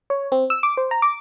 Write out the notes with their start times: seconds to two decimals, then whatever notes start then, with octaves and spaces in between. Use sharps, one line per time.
0.10 C#5
0.32 C4
0.50 E6
0.63 D6
0.77 C5
0.91 A#5
1.02 D6